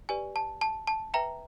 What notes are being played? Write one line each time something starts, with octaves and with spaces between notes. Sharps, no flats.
G4 B4 D5 G#5
A5
A5
A5
B4 E5 G5 A#5